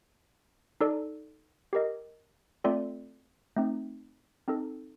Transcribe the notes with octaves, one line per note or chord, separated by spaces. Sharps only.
D#4 A4 D5
G4 A#4 D#5
A3 C4 F4 A4 D5
A3 C4 D#4
C4 D#4 A4